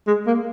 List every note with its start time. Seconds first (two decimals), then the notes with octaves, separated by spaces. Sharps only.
0.07 G#3
0.27 A#3